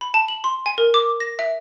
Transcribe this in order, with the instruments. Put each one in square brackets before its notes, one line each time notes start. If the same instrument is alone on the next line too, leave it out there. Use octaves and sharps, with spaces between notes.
[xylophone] B5
A5
F#7
C6
G#5
A#4
D6
A#6
E5